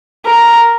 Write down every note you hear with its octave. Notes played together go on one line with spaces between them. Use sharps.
A#4